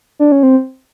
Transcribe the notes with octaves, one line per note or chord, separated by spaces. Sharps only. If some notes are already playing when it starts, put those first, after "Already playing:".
D4
C#4
C4